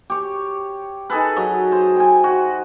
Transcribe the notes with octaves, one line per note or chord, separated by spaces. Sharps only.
G4 C#5
D#4 G#4 A4 B4
F#3 D#5
C5
G5 G#5
F#4